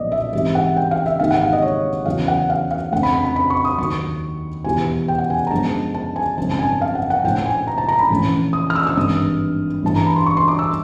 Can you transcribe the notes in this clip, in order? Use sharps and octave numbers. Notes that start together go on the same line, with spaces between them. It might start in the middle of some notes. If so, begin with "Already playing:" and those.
Already playing: B1 A#2 F3 D5 D#5
E5
G#2 E3 G3 C4 E5
F#5
G5
F5
E5
G#1 G#2 D#3 G3 A#3 F5
F#5
F5
D#5
C#5
E2 C#3 F#3 B3 F5
F#5
F5
F5
F2 D3 F3 A3 F#5
B5
B5
B5
B5
C#6
D#6
D#2 D#3 F#3 C#6
E2 B2 G3 B3 G#5
G5
F#5
G#5
A#5
F#2 D3 F3 G#3 B3 A5
A5
G#5
G#1 F#2 C#3 F3 A5
A5
G#5
F5
F#5
F#5
A#1 A2 F3 A3 G5
G#5
A#5
A5
A#5
B5
A#1 A2 E3 A3 C#4
D#6
F6
E6
E6
G#1 G2 E3 D#6
A1 G2 E3 A5
A#5
B5
C6
C#6
C6
D6
E6